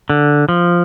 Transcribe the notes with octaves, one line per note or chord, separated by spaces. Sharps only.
D3
F3